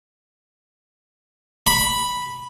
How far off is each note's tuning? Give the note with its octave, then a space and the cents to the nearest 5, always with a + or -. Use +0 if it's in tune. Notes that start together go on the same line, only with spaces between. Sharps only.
B5 -5